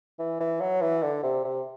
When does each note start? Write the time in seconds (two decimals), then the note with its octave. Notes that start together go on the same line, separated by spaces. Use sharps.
0.19 E3
0.40 E3
0.61 F#3
0.82 E3
1.03 D3
1.23 C3
1.45 C3